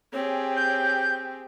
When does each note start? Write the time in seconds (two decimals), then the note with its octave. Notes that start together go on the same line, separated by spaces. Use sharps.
0.13 C4 G4 G#4 C#5
0.56 G6